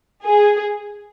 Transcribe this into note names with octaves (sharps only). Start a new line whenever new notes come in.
G#4